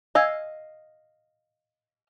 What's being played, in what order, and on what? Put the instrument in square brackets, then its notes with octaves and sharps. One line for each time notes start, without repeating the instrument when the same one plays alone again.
[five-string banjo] D#5 F5 [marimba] G#5 E6 G#6